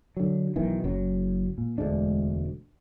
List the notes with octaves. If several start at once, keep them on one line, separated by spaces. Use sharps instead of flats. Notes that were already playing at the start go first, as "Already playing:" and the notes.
D3 F#3
B1 B2 D#3 E3
F#1 F#2 F#3
A#2
E1 D2 G#3 D4